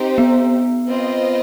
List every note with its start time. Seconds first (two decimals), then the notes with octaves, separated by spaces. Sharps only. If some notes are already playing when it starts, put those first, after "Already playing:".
Already playing: C4 D#4 G4 C5
0.18 B3
0.87 C4 F4 B4 D#5